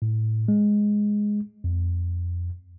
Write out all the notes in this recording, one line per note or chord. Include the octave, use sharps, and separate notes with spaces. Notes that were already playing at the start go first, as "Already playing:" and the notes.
A2
G#3
F2